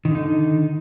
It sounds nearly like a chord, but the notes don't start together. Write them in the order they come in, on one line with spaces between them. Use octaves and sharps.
D#3 D3 D#4